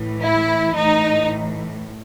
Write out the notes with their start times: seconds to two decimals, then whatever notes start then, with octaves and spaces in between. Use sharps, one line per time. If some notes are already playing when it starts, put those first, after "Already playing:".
Already playing: A2 E3
0.23 E4
0.76 A2 E3 D#4